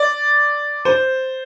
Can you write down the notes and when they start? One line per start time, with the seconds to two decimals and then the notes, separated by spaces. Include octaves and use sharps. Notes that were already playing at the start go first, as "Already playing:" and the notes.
Already playing: D5
0.85 C5